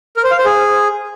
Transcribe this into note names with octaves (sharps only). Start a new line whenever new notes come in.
A#4
C5
F5
C5
G#4